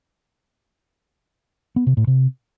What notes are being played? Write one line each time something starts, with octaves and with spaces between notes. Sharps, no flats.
B3
C3
A2
C3